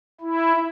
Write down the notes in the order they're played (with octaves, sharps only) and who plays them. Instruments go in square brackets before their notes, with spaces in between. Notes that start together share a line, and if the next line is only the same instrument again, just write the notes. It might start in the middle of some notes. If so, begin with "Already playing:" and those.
[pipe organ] E4